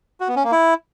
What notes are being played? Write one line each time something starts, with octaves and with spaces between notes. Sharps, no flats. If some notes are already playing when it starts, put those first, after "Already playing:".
F#4
B3
C#4
A#3
E4